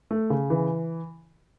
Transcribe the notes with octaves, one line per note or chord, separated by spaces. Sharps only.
A3
C#3
E3